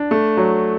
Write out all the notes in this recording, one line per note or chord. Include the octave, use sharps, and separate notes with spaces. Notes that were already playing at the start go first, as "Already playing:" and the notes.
Already playing: D4
A3
F#3